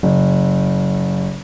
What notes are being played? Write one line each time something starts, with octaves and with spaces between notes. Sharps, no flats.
F#1